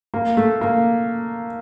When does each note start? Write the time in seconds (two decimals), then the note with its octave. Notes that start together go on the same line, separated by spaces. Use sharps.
0.14 A#3
0.37 A3
0.61 A#3